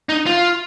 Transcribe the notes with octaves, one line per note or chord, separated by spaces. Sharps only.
D#4
F4